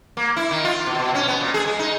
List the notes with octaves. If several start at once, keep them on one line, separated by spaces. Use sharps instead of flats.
A#3
E4
D#3
F4
B2
B2
C#4
B3
A#2
G#4
G#3
D#4